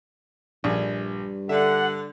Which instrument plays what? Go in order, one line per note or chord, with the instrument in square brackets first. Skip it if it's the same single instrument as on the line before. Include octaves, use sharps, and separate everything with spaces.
[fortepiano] A#1 G#4 [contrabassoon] G2
[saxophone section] D3 [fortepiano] E5 [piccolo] F#5